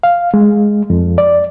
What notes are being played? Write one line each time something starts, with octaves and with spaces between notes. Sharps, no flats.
F5
G#3
F2
D5